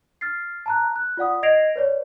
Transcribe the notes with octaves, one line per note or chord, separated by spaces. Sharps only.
F6 A6 C7
A5 A#5 F#6
F#6
F4 D5 F#5 D#6
D#5 G#6 A#6 C7 D7 F7
B4 C#5 D5